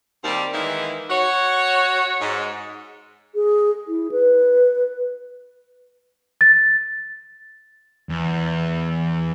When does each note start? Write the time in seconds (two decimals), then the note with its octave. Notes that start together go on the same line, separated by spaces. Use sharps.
0.24 D#2 G3 C4 G4 A#4 D5
0.53 D#3 E3 G#3 A#3 D#4 E4
1.10 F#4 C#5
2.21 G#2
3.35 G#4
3.88 E4
4.12 B4
6.41 A6
8.09 E2